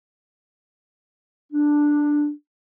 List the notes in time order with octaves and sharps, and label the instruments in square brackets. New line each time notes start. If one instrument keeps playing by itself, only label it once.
[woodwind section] D4